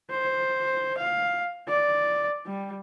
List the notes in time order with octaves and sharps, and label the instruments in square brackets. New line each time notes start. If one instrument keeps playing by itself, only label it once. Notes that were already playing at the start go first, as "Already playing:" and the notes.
[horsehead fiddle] C5
F5
D5
G3